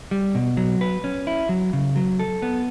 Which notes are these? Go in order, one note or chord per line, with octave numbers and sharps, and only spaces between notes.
G3
B2
F#3
B4
C#4
E4
F#3
C#3
F#3
A4
B3